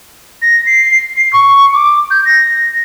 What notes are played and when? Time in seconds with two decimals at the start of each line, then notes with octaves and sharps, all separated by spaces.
0.41 A#6
0.66 C7
1.15 C7
1.32 C#6
1.73 D6
2.10 G6
2.24 A#6